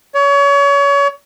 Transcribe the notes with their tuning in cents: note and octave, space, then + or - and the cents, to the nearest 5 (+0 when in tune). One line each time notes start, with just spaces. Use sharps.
C#5 +30